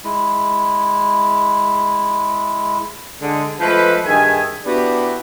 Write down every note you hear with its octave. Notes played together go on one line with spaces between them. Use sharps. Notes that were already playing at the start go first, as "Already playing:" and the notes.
G#3 E4
D3 G#3
F3 G#3 A3 A4 B4
G2 D#3 G#4 E5 G#5
B3 D4 E4 F#4 G4